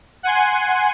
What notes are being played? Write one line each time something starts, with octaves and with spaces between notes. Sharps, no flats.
F#5 G#5 C6